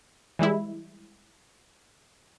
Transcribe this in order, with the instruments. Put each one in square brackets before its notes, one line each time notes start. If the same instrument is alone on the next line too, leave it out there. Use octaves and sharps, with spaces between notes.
[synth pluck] E3 G3 G#3 E4